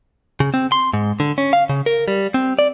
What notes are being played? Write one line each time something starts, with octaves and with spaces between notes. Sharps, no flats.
C#3
C4
C6
G#2
D3
C#4
F5
C#3
A#4
G3
C4
D5